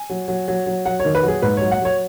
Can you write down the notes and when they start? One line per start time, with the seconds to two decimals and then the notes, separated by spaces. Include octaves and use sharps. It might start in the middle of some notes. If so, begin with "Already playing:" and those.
Already playing: G#5
0.10 F#3
0.28 F#3
0.48 F#3
0.66 F#3
0.85 F#3 F#5
1.00 C#5
1.05 D#3
1.15 B4
1.23 F#3
1.28 G#4
1.42 G#2 B4
1.57 F#3 C#5
1.71 F#5
1.81 F#3 C#5